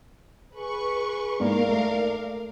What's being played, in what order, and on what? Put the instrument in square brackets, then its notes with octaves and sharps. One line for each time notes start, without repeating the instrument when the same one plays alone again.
[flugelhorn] G#4 [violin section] B4 C#6
[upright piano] G#2 A#3 [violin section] A#4 F5 [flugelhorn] D5
[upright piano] A3